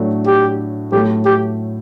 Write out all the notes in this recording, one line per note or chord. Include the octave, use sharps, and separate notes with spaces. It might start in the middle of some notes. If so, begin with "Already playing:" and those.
Already playing: A2 F#3 A3 D4
G4
A2 F#3 A3 G4
G4